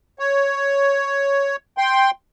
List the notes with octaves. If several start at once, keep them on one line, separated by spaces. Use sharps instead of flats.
C#5
G5 C6